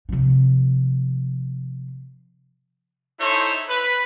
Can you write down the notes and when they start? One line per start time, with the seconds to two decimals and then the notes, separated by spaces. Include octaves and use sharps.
0.09 C3 F3
3.20 D#4 E4 A4 C5 C#5
3.69 B4